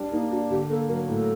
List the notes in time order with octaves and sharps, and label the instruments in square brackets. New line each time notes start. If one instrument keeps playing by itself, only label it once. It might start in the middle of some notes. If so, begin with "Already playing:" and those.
Already playing: [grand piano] G3 D4
[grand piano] A#3 [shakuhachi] D#4
[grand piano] D4 [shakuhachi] F#4
[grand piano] D3 [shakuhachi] G4
[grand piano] A#3 [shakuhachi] A4
[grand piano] F#3 [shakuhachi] A#4
[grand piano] A2 [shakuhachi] A4